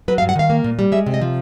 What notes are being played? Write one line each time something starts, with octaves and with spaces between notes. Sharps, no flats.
F#3 B4
F5
G2
F#5
D#3 F5
A#3
A#2
G3
G#3 E5
C3
D#5
F3